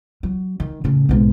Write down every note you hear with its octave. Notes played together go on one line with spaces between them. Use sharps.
F#3
D#3
A2 C#3
B1 G#2